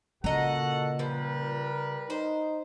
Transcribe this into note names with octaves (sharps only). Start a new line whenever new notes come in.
A#2 C#3 F#4 A4 D#5 F#5 A#5
F3 G3 A#4 B4
D#4 C5